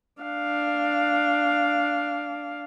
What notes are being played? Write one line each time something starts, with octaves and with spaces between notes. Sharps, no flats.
D4 F5